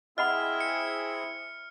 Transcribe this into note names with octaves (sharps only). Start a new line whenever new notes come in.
C4 E4 G#4 D#5 F#5 B5 F6
C#7